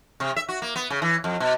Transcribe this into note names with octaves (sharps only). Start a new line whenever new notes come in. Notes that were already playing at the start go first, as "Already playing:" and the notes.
C3
E5
F#4
A#3
B3
C#3
E3
F2
B2